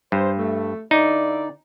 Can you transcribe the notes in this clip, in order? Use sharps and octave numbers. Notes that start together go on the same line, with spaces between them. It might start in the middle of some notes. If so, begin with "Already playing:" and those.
G2 C5
A3
D3 D#4 E4 D5